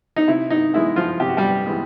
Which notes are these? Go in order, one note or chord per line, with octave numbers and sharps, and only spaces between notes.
D#4
C3 E4
D#4
E3 G#3 B3 E4
F3 F4
C3 G4
F#4
G3 G4
E3 G#3 B3